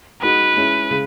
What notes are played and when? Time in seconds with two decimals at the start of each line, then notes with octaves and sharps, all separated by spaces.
0.22 G#3 D#4 F#4 B4
0.56 G#3 C#4 E4
0.90 C#3 G#3